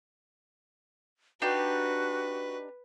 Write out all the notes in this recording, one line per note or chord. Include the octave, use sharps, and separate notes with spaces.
D4 D#4 F#4 G4 B4